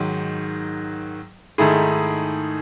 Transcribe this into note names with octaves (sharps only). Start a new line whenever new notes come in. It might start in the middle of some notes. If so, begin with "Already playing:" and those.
Already playing: G#2 D#3 F#3
G#2 D#3 A3 E4 G#4